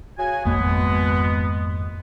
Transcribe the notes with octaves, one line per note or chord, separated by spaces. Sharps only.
C#3 F#4 G#5
G#1 F2 B2 G#3 A#3 B3